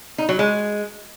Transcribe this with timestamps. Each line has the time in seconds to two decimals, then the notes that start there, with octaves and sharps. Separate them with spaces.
0.18 D#4
0.29 F#3
0.39 G#3